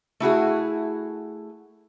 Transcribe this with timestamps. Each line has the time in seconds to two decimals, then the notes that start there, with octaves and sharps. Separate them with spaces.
0.20 A3 E4 F#4 G#4